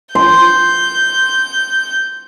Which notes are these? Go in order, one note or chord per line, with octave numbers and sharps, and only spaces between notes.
C6 G6